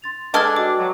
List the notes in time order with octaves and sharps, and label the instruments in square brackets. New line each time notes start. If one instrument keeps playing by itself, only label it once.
[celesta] C6 A6 F7
[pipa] G#3 A4 [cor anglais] D4 [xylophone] B4 F6 G#6
[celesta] F#4 D#5 G5 [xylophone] D6
[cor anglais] F#3